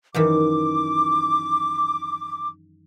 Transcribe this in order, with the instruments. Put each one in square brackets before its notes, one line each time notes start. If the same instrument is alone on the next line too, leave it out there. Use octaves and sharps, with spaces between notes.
[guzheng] F#2 D#3 E3 [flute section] D6